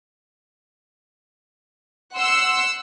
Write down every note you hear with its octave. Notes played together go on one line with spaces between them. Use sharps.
F#5 C6 E6